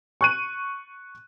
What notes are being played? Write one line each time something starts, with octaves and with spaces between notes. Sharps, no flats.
C#6 F#6 D#7